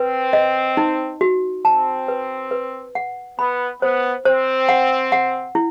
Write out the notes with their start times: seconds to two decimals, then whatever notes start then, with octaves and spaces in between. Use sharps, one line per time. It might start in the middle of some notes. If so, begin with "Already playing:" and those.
Already playing: C4 B4
0.33 D#5
0.77 D#4
1.21 F#4
1.64 C4 A5
2.08 B4
2.51 B4
2.95 F#5
3.39 B3 B5
3.82 B3 C5
4.25 C4 C5
4.69 F#5
5.12 F#5
5.55 E4